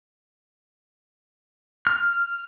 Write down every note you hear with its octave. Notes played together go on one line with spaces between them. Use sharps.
F6